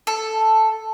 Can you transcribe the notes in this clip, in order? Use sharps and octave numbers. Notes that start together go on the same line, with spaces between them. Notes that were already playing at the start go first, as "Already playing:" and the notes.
A4